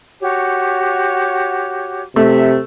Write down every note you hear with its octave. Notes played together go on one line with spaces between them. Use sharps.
F#4 G4 C#5
C3 A3 E5